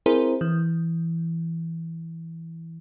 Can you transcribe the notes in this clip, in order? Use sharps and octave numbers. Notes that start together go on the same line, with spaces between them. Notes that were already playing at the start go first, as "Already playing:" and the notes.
C4 E4 G#4 A#4 C5
E3